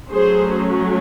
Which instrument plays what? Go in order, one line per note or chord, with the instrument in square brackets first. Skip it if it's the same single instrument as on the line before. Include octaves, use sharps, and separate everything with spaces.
[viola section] F#3 A3 C#4 G#4 C5